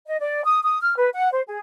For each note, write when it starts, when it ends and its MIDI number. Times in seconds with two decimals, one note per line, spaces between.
0.07 0.19 75
0.19 0.44 74
0.44 0.61 87
0.63 0.78 87
0.81 0.94 89
0.97 1.09 71
1.14 1.30 78
1.32 1.41 72
1.47 1.58 68